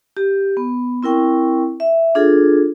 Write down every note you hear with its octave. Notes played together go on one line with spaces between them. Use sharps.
G4
B3
C4 E4 A#4 G5 C#6
E5
D4 F4 G#4 A4